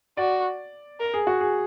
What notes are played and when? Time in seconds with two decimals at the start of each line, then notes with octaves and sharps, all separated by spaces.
0.17 F#4 D5
1.00 A#4
1.14 G#4
1.27 F#4
1.41 G#4